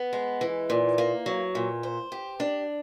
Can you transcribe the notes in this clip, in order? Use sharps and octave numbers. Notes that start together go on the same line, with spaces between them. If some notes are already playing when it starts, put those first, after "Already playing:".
Already playing: B3
G#3
E3
A#2
A#3
F#3
A#2
C5
G4
D4